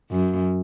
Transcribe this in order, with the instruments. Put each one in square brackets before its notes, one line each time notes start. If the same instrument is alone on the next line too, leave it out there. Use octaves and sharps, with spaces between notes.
[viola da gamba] F#2